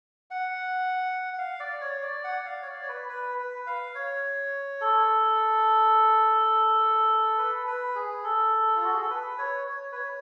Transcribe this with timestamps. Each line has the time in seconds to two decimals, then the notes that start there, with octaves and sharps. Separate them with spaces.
0.31 F#5
1.33 F#5
1.38 F5
1.60 D5
1.81 C#5
2.03 D5
2.24 F#5
2.37 D5
2.45 F5
2.62 C#5
2.67 D5
2.83 C#5
2.88 B4
3.09 B4
3.39 B4
3.67 F5
3.95 C#5
4.81 A4
7.38 B4
7.67 B4
7.95 G#4
8.24 A4
8.76 F4
8.84 F#4
8.92 G#4
9.02 A4
9.10 B4
9.38 C#5
9.67 C#5
9.92 B4
9.95 C#5